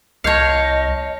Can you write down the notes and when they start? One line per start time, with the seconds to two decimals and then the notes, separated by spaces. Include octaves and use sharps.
0.24 C2 C#5 D#5 F5 A5 G6 C#7